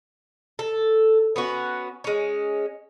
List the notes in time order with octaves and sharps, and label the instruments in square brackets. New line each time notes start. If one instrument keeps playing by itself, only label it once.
[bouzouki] A4
B3 C#4 F#4
G#3 C#4